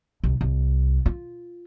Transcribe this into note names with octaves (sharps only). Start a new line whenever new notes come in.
C2
C2
F4